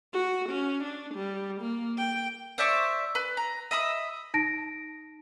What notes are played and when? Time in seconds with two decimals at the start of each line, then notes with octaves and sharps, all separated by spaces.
0.13 F#4
0.49 C#4
0.83 D4
1.14 G3
1.61 A#3
1.98 G5
2.58 C5 D5 E5 C#6
3.15 B4
3.37 A#5
3.71 D#5 E5 B5 D#6
4.34 D#4 A5 A#6 D7